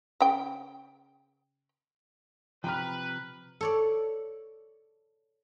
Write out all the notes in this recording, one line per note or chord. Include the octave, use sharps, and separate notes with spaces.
C#3 G5
C3 F3 B4 G5 A#5 F6
A4 C#5 D5